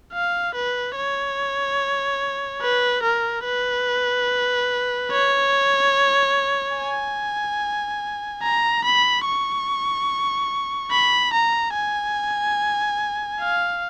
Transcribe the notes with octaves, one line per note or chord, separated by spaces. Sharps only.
F5
B4
C#5
B4
A#4
B4
C#5
G#5
A#5
B5
C#6
B5
A#5
G#5
F5